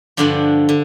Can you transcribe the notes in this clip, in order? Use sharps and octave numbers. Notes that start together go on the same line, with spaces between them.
G2 D3 F3 D4
D3